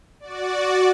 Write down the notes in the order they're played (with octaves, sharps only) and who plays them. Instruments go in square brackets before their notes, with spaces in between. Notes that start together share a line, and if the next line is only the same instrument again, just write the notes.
[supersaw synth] F#4 D5